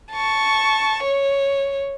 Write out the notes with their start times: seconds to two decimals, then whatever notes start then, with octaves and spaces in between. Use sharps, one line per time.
0.12 A5 C#6
1.03 C#5